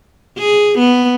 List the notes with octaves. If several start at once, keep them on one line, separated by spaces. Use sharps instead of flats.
G#4
B3